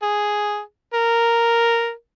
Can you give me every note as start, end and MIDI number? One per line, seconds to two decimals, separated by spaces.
0.02 0.61 68
0.94 1.91 70